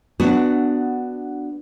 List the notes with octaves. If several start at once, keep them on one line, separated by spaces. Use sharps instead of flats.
B3 D4 F#4